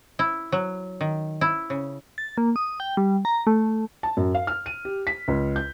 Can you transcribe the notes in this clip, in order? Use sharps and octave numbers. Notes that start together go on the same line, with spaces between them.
E4
F#3
D#3
E4
C#3
A6
A#3
D#6
G5
G3
A#5
A3
A5
F#2
F5
F6
D#7
G4
B6
C#2
G6